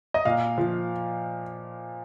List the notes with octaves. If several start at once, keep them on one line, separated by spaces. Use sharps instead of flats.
D#5
A#2 F5
F3